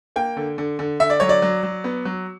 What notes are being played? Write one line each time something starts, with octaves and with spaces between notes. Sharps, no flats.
A#3 G5
D3
D3
D3
D3 E5
D5
F#3 C#5
D5
F#3
F#3
B3
F#3